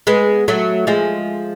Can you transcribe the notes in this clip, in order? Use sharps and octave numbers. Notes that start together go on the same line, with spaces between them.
G#3 B3
F#3 A3
F3 G#3